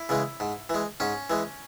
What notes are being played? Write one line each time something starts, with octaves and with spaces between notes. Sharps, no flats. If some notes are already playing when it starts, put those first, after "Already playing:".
Already playing: E4
C#3 E3 G#3
G#2
E3 G#3
G#2 C#4
E3 G#3